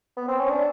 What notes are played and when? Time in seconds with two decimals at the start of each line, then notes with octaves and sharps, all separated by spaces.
0.17 B3
0.28 C4
0.40 C#4
0.50 D4